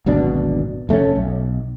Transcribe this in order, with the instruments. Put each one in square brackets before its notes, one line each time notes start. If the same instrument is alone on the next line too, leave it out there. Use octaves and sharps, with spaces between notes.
[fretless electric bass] D1 G#1 B2 D4
F1 A3 C4 C#4
B1